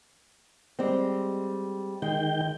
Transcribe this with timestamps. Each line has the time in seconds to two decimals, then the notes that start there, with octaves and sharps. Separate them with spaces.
0.79 G3 G#3 C4
2.02 D#3 G#3 G5